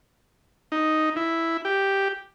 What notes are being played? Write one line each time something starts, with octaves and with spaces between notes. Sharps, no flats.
D#4
E4
G4